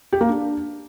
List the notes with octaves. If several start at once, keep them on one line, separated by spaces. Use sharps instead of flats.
G4
A#3
D4